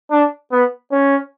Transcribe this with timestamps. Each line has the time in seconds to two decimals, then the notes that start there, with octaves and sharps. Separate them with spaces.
0.11 D4
0.52 B3
0.92 C#4